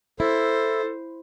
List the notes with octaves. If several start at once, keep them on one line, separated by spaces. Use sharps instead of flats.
E4 A4 C5